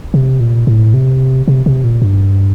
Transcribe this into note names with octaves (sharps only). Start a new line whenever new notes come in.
C3
A#2
A2
C3
C3
C3
A#2
G2